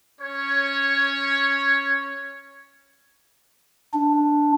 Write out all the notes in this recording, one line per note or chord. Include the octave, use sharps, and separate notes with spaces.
C#4 C#5
D4